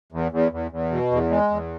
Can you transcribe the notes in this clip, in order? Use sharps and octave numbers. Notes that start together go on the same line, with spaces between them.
E2
E2
E2
E2
B2
E2
G#3
E2